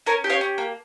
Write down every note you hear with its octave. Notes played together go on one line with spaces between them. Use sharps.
C#4 A#4 C#5
G4
C#5 F5
C#4
A#3